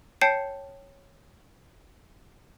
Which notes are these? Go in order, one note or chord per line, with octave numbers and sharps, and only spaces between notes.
C#5 G5 A5 G6 C7 C#7